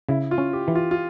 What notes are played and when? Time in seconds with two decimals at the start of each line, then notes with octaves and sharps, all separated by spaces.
0.09 C#3 E4
0.31 F4
0.38 C#4
0.53 G4
0.68 E3
0.75 F4
0.91 F4